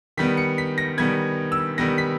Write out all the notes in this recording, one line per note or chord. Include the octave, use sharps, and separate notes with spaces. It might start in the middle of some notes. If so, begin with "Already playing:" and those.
D#3 G3 B3 B6
C#7
B6
A#6
D#3 G3 B3 G#6
E6
D#3 G3 B3 A#6
B6